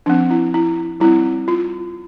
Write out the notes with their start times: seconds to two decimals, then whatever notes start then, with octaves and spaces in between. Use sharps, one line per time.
0.06 F3 C4 D4
0.31 E4
0.54 E4
1.00 G3 C4 E4
1.48 F4